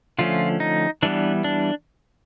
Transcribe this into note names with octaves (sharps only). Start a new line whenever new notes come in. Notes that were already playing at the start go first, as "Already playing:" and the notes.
D3 F3 A3 C#4 F4
D#4
E3 G3 B3 D4
D4